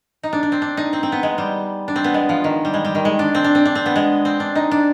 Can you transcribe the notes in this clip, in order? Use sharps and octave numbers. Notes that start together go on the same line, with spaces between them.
D#4
D4
D4
C4
D4
D#4
C4
C4
B3
G#3
G3
D4
C4
B3
G#3
F3
D#3
G3
G#3
G3
D#3
G#3
D4
C4
D4
C4
D4
C4
B3
G#3
C4
D4
D#4
D4